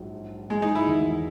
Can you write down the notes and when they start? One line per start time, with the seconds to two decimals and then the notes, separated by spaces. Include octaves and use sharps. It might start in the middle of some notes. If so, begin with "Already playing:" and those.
Already playing: A#1 G#2 F#3
0.50 G#3
0.62 D#4
0.75 E4
0.87 E2 D#3 F#3